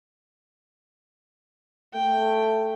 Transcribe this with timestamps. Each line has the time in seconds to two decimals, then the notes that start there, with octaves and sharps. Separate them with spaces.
1.93 A3 G5